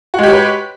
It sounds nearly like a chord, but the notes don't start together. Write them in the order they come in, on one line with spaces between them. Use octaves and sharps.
F#4 G#3 G4 C#5 B4